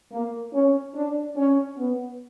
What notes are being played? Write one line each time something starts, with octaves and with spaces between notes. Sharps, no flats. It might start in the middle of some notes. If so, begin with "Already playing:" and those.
A#3
C#4
D4
C#4
B3